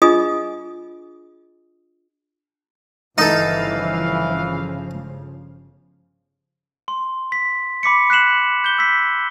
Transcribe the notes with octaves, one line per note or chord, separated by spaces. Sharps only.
D4 F4 G#4 D#5 G#5 D#6
G1 C#3 E3 F3 D#4 A4 F5
C6
B6
B5 D6 B6 C#7
F#6 B6 C7 E7 F#7
G6 G7
E6 B6